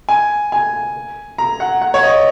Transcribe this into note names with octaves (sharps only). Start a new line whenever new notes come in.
G#5
G#5
A#5
F#5
F#5
C#5
D#5